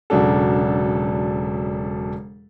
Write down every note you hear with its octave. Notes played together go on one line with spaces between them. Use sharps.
E1 C#3 F#3 D4 A4